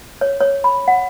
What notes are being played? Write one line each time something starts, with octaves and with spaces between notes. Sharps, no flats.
C#5
C#5
B5
F#5